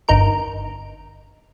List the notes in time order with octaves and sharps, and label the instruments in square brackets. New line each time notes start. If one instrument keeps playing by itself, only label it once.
[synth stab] G1 D#4 A#4 D7